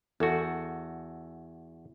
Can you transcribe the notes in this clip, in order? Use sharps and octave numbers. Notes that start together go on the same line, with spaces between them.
E2 F#4 A4